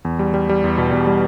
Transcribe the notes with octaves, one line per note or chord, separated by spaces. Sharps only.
E2
G3
G3
G3
E2
B2
E2
G3